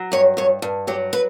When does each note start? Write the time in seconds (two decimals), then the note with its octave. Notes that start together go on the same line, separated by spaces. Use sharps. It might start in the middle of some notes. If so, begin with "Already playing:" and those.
Already playing: F#3
0.12 G2 C#5
0.37 G2 C#5
0.62 G2
0.87 F#3 G4
1.13 B4